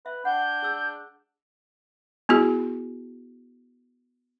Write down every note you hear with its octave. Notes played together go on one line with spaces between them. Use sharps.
B4 E5
D4 F#5 G5 G6
G#4 E6
B3 E4 F#4 G#4